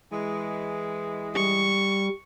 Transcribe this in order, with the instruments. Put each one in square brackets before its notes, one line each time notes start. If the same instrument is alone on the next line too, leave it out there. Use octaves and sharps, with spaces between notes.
[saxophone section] E3 G#3
[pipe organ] G3 [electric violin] C#6